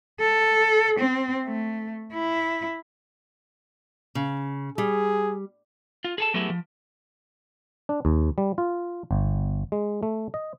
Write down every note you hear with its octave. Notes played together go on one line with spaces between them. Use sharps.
A4
C4
A3
E4
C#3
G3 G#4
F4
G#4 A4 A5
F#3 A3 B3 E4 G4 G#4
F3
D4
D#2
G3
F4
G1
G#3
A3
D#5